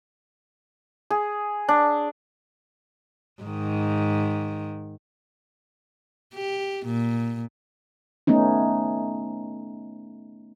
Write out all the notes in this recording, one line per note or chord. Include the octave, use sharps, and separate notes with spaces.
G#4
D4
G#2 D#3
G4
A#2
A3 B3 C#4 D#4